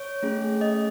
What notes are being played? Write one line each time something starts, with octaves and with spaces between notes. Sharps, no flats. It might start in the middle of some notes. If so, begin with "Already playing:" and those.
Already playing: C#5
A3 C#4 G#4
D#5